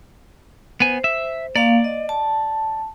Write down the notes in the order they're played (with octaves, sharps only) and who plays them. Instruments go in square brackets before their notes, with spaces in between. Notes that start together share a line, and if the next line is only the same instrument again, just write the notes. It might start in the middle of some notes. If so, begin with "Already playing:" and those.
[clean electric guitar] B3 G#5 [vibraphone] C5
[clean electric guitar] E5
[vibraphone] A#3 F5 [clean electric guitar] D5
[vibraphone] D#5
A5